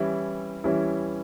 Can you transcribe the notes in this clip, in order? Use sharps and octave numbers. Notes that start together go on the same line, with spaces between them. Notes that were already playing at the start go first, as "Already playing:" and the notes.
Already playing: E3 G3 C#4 E4
E3 G3 C#4 E4